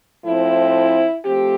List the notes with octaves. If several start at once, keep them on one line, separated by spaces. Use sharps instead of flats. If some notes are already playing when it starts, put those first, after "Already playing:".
A2 F3 C4 E4
F3 A3 C4 G4